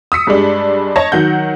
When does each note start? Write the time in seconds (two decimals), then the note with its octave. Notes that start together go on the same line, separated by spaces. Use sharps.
0.12 D#6 E6 B6 C#7
0.27 G2 G3 G#3 D4
0.96 C#5 D#5 A5 A#6
1.12 D#3 F#3 F#5 G6